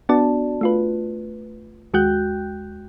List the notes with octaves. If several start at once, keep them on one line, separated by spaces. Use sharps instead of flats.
B3 D4 F#4 D5 A5
A3 F4 B4
D#2 G#3 F#4 G5 F#6 G6